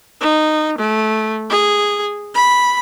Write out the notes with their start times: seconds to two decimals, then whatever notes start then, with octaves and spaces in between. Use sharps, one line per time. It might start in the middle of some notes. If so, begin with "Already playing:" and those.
0.21 D#4
0.78 A3
1.50 G#4
2.35 B5